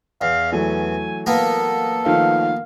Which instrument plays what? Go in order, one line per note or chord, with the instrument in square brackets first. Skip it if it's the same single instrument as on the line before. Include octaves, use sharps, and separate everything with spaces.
[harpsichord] E2 [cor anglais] F5
[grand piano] E3 F#3 A3 [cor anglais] G#5
[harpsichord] A#3 B3 [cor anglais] A4
[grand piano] D#3 F3 A3 [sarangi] F5